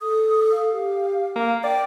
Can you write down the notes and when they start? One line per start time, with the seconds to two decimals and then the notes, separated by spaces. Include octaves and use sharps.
0.01 A4 D#6
0.52 F5
0.71 G4
1.36 A#3 F5
1.64 D5 G5